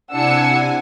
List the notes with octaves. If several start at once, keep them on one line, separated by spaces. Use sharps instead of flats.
C3 D4 E4 F#5 G#5 E6 C#7